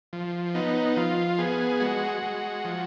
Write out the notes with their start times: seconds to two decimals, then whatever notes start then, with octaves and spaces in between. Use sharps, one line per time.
0.13 F3
0.55 B3 D#4
0.97 F3 F4
1.39 B3 G#4
1.80 G#3 F#4
2.22 G#3
2.65 F3